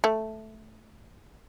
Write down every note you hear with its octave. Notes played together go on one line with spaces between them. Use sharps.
A3